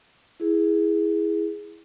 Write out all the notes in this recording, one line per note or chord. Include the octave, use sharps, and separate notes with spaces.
E4 G#4